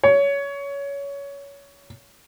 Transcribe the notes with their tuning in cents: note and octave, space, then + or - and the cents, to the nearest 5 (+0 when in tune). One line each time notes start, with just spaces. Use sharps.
C#5 +20